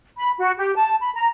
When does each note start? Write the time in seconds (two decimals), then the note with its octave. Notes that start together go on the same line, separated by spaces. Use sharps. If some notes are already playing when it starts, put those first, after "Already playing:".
0.18 B5
0.39 F#4
0.58 G4
0.75 A5
1.01 B5
1.15 A#5